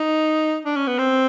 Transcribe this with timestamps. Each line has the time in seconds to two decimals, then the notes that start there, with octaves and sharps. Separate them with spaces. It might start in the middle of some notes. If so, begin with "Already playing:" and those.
Already playing: D#4
0.65 D4
0.76 C#4
0.87 B3
0.99 C4